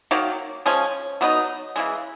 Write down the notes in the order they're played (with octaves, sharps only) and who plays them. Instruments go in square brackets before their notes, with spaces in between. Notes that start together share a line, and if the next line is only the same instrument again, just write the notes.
[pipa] D#3 F#3 A#3
F3 G#3 C#4
F#3 B3 D#4
C#3 E3 G#3